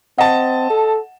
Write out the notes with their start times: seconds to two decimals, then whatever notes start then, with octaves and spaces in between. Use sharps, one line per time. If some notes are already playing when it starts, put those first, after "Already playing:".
0.18 C4 D#5 F#5 A5
0.70 A4